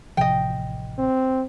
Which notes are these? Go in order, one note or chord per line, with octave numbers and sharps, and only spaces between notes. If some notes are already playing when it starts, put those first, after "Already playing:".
A1 C3 F3 D#5 G5
C4